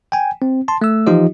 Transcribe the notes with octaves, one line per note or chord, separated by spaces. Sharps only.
G5 G#5
C4
A5 C6
A3 E6
E3 F3 D#4 F4 G4 D#5